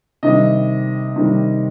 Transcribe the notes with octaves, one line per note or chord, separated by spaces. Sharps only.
C3 D#3 G3 D#5
C3 D#3 G3